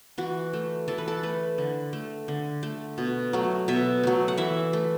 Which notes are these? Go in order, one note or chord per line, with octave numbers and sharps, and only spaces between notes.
E3 F#4
A3
E3 A4
B4
A4
A3 B4
D3
A3
D3
A3
B2
F#3 A3
B2 E5
F#3 A3
F#5
E3 E5
A3